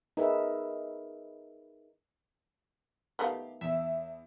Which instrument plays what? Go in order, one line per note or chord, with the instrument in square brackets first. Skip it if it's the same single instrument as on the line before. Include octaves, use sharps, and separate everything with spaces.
[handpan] D#4 G#4 A#4 B4 E5
[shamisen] D#3 A3 B3 [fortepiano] G4 F5
[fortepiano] E2 [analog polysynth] E5